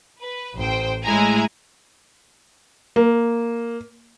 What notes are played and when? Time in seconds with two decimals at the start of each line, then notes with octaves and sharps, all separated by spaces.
0.20 B4
0.57 A1 C5 G5
1.04 A2 G#3 E4 G#5 A#5
2.96 A#3